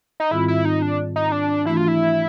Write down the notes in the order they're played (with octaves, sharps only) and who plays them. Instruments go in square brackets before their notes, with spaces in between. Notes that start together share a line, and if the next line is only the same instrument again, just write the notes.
[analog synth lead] D#4
[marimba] G#2 D#3 G3 C4 F4 [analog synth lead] E4
[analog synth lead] E4
D#4
D4
D#4
D4
[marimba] E3 A3 D4 F#4 [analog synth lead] E4
[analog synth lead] F4
E4